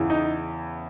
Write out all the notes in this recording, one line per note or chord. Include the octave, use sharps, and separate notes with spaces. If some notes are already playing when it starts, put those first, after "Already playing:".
Already playing: E2 C#3 E3
D#4